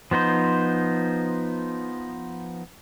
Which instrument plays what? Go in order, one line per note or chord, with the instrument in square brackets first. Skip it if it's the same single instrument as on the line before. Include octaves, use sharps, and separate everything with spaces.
[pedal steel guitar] F3 B3 D#4 C5